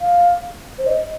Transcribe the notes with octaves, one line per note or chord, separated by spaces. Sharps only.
F5
C5
D#5